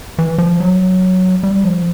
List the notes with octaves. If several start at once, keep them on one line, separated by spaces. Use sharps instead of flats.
E3
F3
F#3
G3
F3